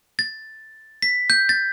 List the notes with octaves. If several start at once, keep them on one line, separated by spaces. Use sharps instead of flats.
A6
B6
G6
A6